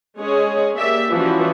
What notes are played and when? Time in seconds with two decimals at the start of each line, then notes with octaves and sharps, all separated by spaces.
0.19 G#3 C#4 G#4 C#5 D#5
0.75 A#3 G4 D5 E5
1.10 E3 F3 G3 C#4 E4 F#4